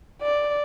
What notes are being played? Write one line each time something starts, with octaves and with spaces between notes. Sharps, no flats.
D5